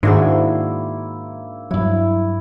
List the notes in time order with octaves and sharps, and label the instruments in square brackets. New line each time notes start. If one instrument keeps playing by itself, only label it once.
[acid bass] G#2 [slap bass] D#3 [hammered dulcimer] A#3 E4 C6 [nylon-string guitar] D4 F#4 G#4
[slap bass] G2 F#3 [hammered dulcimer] E4